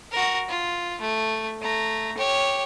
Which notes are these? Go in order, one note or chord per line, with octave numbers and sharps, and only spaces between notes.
F#4 A#4
F4
A3
A3 A#5
G4 C#5